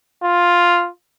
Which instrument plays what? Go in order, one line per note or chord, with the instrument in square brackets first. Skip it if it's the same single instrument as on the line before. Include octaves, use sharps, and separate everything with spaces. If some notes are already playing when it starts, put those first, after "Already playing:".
[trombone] F4